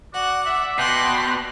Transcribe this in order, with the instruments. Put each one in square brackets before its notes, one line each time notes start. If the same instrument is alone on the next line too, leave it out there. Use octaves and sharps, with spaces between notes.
[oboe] F#4 [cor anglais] D5 [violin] F#5
[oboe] E5
[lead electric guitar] B2 [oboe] G5 [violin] C6 F#6